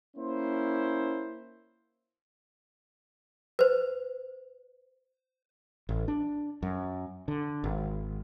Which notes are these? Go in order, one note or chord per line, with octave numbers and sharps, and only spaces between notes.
A#3 C#4 E4 C5
B4 C5
A1
D4
F#2
D3
G#1